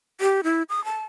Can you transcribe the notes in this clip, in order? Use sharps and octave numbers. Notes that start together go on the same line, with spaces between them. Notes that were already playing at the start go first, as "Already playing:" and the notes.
G4
E4
D#6
A5